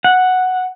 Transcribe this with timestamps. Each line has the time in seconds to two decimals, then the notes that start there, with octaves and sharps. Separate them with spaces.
0.04 F#5